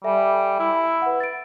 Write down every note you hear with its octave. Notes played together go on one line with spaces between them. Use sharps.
G3 A4 E5 G#5
E4
B4 F#5
A6 D7